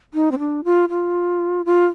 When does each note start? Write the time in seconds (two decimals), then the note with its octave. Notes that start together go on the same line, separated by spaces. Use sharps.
0.14 D#4
0.31 C4
0.39 D4
0.64 F4
0.90 F4
1.65 F4